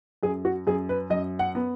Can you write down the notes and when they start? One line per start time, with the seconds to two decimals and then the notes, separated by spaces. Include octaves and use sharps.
0.23 F#2 G#4
0.45 F#4
0.67 F#2 G#4
0.89 B4
1.10 F#2 D#5
1.39 F#5
1.55 B3